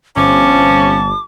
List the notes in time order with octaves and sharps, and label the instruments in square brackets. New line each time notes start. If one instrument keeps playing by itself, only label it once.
[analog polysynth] G1 [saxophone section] C3 F3 C#4 [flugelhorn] A5 [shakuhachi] D6